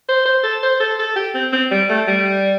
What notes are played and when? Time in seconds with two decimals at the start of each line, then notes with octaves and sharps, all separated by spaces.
0.09 C5
0.26 C5
0.44 A4
0.63 C5
0.80 A4
0.99 A4
1.16 G4
1.34 C4
1.52 C4
1.71 G3
1.90 A3
2.07 G3